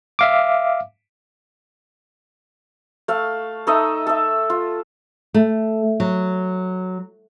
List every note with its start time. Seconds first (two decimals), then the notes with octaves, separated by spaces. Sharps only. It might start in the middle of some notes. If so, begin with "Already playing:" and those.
0.19 E5 F5 D6
3.08 A3 F5
3.67 A3 D#4 D#5 E5
4.07 A4 E5
4.50 F4
5.34 A3
6.00 F#3